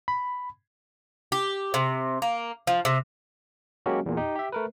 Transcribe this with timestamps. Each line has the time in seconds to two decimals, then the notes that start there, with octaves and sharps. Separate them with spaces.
0.08 B5
1.32 G4
1.74 C3
2.22 A#3
2.67 F3
2.85 C3
3.86 F#3 G#3 A#3 C#4 F#4 G4
4.06 E2 A#2
4.17 D#4 G4
4.36 G4 E5
4.52 A3 A#4 B4